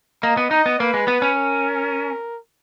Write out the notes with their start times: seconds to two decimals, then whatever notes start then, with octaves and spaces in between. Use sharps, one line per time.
0.23 A#3 D#5
0.37 B3
0.51 D#4 D#5
0.66 B3
0.80 A#3 B4
0.94 G#3
1.08 B3
1.22 C#4
1.36 A#4